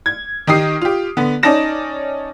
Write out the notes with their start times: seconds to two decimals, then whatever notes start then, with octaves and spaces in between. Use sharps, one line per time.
0.06 G#6
0.47 D#3 D#4 G4 D#6 C7
0.82 F4 G4
1.17 D3 B3
1.43 C#4 D#4 D5 A5 A#6 E7